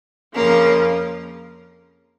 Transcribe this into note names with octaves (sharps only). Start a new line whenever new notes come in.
F2 C#3 F3 A#3